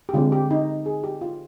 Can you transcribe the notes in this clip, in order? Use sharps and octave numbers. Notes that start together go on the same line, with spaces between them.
G4
D3 G#3 C4 F4
G4
D#4
G#4
G4
F4